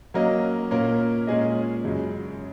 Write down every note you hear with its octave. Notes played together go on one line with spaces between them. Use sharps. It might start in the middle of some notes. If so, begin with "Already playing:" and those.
F#3 A#3 C#4 A#4 D#5
A#2 A#3 C#4 A#4
A#2 G#3 C#4 G#4 D#5
F#2 C#3 G#3